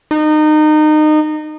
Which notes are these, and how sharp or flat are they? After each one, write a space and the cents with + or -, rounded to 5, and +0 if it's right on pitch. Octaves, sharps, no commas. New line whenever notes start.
D#4 -25